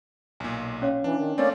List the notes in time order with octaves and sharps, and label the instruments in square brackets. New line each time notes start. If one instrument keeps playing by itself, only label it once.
[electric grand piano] B1 A#2 [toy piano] G#5
[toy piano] C#4 C#5 F5
[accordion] E3 [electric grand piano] D4
[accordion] D#3
[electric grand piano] A3 C4 [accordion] A#3 C#4 D5